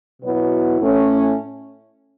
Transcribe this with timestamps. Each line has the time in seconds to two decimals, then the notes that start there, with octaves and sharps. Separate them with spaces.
0.22 B2 F#3 B3 E4
0.79 A2 A3 C#4